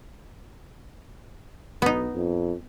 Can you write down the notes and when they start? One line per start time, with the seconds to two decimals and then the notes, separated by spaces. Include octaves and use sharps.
1.82 B1 B3 D#4
2.14 F2